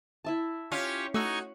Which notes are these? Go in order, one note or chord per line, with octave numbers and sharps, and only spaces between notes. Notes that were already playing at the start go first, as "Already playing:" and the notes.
E4 E5 A5
C#4 F4 G4 C#5
A3 D#4 F#4 G#5 C#6 E6